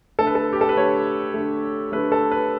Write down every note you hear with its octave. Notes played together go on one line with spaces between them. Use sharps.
D3 A3 A4
B4
A4
G4
A4
B4
D3 A3 C#5
D3 A3
D3 A3 B4
A4
B4